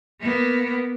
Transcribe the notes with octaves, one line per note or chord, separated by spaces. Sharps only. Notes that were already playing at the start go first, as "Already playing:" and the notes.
A#3 B3